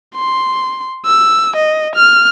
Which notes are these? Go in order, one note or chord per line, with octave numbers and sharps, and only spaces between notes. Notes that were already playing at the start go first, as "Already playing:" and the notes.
C6
E6
D#5
F6